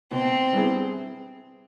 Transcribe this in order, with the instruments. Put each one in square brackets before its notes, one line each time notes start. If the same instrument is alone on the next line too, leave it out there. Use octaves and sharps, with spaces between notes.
[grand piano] B2 [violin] C4
[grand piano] G3 B3 E4 G#4